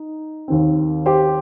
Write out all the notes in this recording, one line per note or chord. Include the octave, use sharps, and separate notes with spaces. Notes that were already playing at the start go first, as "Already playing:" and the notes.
Already playing: D#4
D#2 D#3 C4
G4 C5